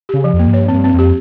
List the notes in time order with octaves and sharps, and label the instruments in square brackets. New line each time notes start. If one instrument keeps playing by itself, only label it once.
[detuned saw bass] C#3 [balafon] G4
[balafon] F3
[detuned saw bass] F2
[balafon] A#3
[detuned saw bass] G#2
[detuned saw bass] G2 [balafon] C#5
[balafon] C4
[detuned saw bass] G2
[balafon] C4
[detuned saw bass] F2 [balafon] G4